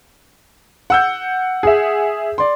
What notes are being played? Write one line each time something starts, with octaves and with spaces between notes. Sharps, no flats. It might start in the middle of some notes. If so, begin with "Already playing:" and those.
F#5 E6 G6
G#4 E5
D5 C6